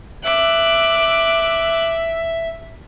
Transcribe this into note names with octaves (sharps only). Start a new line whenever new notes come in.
E5 D6 F#6